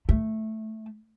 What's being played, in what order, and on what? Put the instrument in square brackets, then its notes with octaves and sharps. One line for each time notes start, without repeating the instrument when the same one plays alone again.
[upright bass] A3